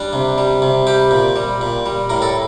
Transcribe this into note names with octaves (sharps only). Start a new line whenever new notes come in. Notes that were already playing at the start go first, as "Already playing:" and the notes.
Already playing: G3 D4
C3
G3
C3
G3 G4
A#2
G3
A#2
G3
A2 A#4
A4